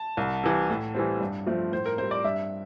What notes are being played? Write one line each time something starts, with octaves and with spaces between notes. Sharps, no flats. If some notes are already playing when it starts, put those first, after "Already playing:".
Already playing: A5
C2
C3 E3
A2
E3 G3 C4
G2
F3 A3 C4
A2 C5
A#4
G3 C4 C5
D5
G2 E5